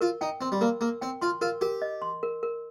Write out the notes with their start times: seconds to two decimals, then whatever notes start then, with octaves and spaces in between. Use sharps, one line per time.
0.01 F4 A#4
0.21 D#4 G5
0.41 C4 C6
0.52 G3
0.61 A#3 A#4
0.81 A#3 A#4
1.01 C4 G5
1.21 F4 C6
1.41 F4 A#4
1.61 G4 A#4
1.82 D#5
2.02 C6
2.23 A#4
2.43 A#4